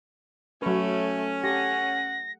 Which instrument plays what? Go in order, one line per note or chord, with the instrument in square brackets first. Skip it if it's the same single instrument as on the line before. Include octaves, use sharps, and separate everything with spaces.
[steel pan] F#3 B4 [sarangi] A3 [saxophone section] C#4
[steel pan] G4 A4 [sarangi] F#5 [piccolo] A#6